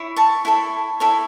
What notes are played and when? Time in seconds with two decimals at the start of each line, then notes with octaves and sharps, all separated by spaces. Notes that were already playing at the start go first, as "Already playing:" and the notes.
Already playing: E4 C#5
0.16 A5 C#6
0.45 E4 A4 C#5
1.00 E4 A4 C#5